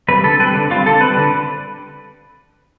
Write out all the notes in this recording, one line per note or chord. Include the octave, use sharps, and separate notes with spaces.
G3 C4 B4
D3 A4
G3 C4 B4
D3
G3 C4 F4
D3 A4
G3 C4 B4
D3